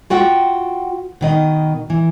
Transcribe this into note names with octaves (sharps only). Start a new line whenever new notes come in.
F4 F#4 F#5 G5
B2 D#3 D#5
E3